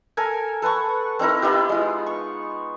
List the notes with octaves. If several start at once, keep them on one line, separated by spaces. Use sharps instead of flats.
A4 A#4 G#5
A4 B4 F#5 C#6
C4 D#4 E4 A#4
B3 D#4 E4 G4
G#3 F4
C#6